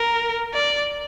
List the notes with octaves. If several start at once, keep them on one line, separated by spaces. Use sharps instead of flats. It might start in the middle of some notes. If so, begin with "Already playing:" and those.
Already playing: A#4
D5